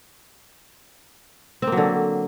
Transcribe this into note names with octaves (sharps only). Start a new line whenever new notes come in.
C4
A#3
F#3
D3